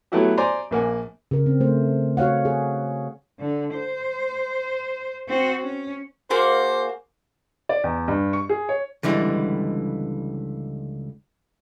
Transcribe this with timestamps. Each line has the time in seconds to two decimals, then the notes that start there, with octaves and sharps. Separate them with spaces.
0.12 F#3 A3 B3 E4 F#4 G4
0.38 C5 D5 G#5 A#5 C6 D6
0.71 A#1 A#3 F#5 G#5
1.31 C#3 A#4
1.46 C4
1.60 A3 C5
2.17 F#4 C#5 F5 F#5
2.45 G#4
3.39 D3
3.74 C5
5.29 C4 F#4
5.62 C#4
6.30 A#3 F#4 G#4 C5
7.69 D5
7.84 E2
8.08 G2
8.33 C#6
8.49 G#4
8.69 C#5
9.03 C#2 D3 E3 G3 G#3